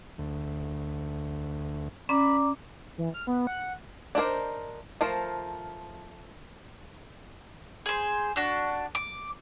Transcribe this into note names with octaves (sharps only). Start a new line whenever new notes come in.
D2
C#4 D5 A#5 B5 D6
E3
F6
B3
F#5
D4 D#4 A#4 C5
F3 A3 A#4 C5
G#4 C5
D4 F#4
D6